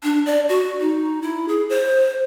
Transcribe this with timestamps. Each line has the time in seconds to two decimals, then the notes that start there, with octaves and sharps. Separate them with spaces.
0.03 D4
0.26 D5
0.49 F#4
0.80 D#4
1.22 E4
1.48 G#4
1.69 C5